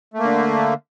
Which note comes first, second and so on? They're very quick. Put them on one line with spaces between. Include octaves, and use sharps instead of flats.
A3 A#3 D3